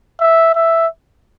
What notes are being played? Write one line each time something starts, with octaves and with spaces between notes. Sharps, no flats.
E5
E5